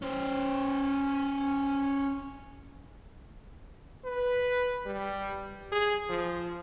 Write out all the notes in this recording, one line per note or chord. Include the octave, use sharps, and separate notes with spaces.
C#4 C5
B4
G3
G#4
F3